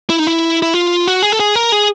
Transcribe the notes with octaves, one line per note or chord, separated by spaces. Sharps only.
E4
D#4
E4
E4
F4
F#4
G#4
A4
G#4
A#4
G#4